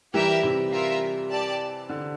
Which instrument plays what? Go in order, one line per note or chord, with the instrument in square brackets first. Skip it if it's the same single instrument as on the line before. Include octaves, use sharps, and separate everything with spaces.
[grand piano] E3 G3 [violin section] G4 A#4 E5 G5
[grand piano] C3 E3
[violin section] F4 A#4 E5
G4 D5 A5
[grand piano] D3